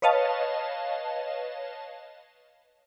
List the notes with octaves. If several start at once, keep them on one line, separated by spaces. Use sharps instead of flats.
B4 C#5 D#5 F5 A5